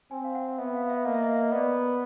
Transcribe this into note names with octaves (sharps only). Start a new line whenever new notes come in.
C4 G#5
F5
F#5
B3 E5
F5
E5
A#3 D#5
E5
D#5
E5
D#5
B3 D5